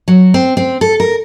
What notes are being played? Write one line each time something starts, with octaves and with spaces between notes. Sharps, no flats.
F#3
C4
C4
A4
A#4